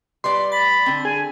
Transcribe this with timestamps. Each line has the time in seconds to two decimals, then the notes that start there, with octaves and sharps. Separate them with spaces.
0.24 G3 B4 D5 C6
0.52 B5 A6
0.86 D3 C4
1.05 G#4 G#5